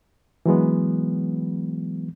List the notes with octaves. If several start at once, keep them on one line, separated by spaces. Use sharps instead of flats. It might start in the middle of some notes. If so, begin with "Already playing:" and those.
E3 F#3 G#3 B3